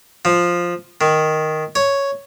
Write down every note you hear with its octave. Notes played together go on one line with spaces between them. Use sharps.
F3
D#3
C#5